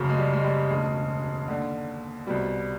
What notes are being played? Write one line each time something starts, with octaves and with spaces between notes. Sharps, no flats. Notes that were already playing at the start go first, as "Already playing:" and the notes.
Already playing: F#1 F#2 C#3
G#3
G3
G#3
G3
E1 D2 C#3 G#3
D#2 D3
C2 B2 G3